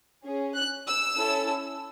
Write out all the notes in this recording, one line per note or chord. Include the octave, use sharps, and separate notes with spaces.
C#4 G#4
F#6
E6
C#4 E4 A4